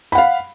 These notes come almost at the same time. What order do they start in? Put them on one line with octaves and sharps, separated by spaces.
B5 F#5 F5